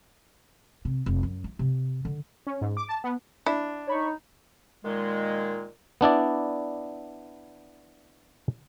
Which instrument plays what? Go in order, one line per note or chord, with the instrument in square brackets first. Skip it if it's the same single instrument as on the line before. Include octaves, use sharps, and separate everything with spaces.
[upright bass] C3
F1
F#2
E4
C3
D3
[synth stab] C#4
G#2
D6
A5
B3
[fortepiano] D4 [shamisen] E4
[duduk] D#4 [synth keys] C#5 B5 C#6
[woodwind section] A#2 D#3 G#3
[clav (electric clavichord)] B3 D4 E4 D5